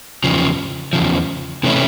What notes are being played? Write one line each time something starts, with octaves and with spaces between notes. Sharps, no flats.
E2 C#3 F3
E2 C#3 F3
C3 E3 A3 C#4 E4